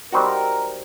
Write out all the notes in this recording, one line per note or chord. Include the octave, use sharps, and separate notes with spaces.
G3 C4 D#4 F#4 A#4